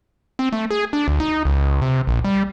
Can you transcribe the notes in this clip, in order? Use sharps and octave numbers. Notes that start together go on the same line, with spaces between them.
C4
A3
G#4
D4
D2
D#4
C#2
C3
A#1
G3